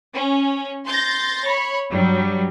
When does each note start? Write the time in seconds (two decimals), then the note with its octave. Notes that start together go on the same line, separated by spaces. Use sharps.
0.14 C#4
0.86 C6 G6 A6 A#6
1.45 C#5 B5
1.91 G2 F#3 G3